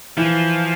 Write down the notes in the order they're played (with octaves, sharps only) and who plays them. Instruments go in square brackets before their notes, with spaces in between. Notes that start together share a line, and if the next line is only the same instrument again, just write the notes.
[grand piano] E3 [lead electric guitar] F3